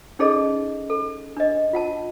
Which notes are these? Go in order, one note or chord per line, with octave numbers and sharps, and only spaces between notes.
C#4 D#4 G#4 A4 D5 D#5
A4
D4 D#5
F4 F#5 A5